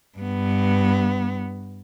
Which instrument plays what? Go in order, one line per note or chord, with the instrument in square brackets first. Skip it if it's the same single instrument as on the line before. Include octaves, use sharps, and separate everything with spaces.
[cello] G2 B3